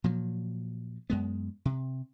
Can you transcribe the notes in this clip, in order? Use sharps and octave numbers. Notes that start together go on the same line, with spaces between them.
A#2 F3 F#3
F#2 G#3 B3
C3